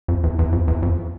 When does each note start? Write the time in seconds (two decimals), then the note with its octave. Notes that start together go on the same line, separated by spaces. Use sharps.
0.08 F2
0.24 E2
0.39 E2
0.52 F2
0.68 E2
0.83 F2